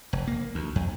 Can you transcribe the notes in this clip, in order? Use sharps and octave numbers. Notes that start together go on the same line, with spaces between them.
F1
A#3
D2
F2